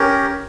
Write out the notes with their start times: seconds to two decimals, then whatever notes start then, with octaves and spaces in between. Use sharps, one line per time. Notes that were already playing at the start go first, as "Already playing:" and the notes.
Already playing: C#4 G4 A#4